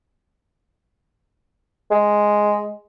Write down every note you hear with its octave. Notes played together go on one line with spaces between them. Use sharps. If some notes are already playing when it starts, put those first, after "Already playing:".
G#3